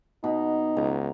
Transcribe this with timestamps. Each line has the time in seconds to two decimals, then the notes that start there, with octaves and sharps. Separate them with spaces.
0.24 B2 D#4
0.77 C#2 A#5